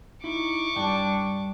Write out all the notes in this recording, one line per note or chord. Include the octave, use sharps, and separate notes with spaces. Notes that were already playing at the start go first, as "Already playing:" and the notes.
D#4 E4 C#6 D6
G2 G3 D4 G5